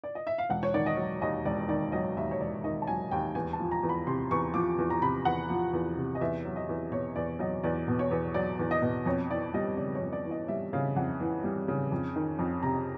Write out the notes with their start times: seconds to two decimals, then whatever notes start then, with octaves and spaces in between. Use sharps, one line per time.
0.04 D5
0.15 D#5
0.27 E5
0.38 F5
0.50 E1 F#5
0.63 C#5
0.74 D#3 D5
0.86 D#5
0.97 F#3
1.21 D#2 D#5
1.45 E1 D5
1.68 D#3 D5
1.92 F#3 D#5
2.17 D#2 E5
2.31 C#5
2.41 E1 D5
2.64 D#3 D#5
2.82 A5
2.87 F#3 G#5
3.11 D#2 G5
3.35 E2 G#5
3.53 A5
3.60 F3
3.72 A#5
3.83 E2
3.89 B5
4.07 C3 C6
4.31 E2 C#6
4.54 F3 D6
4.78 E2
4.90 A#5
5.01 C3 B5
5.25 E2 F#5
5.49 F3
5.73 E2
5.97 C3
6.15 D#5
6.21 E2 E5
6.45 F#3
6.56 D#5
6.69 E2
6.92 B2 C#5
7.16 E2 D5
7.39 F#3 D#5
7.63 E2 D5
7.88 B2
7.99 C#5
8.11 E2
8.34 F#3 D5
8.59 E2
8.71 D#5
8.82 B2
9.06 F2 C#5
9.30 E3 D5
9.54 G3 D#5
9.77 C#3 D5
9.95 C#5
10.01 F2
10.13 D5
10.25 E3
10.31 D#5
10.48 G3 E5
10.73 C#3 F5
10.96 F2 F#5
11.20 E3
11.44 G3
11.68 C#3
11.92 F2
12.16 D#3
12.39 F2
12.63 C3 A#5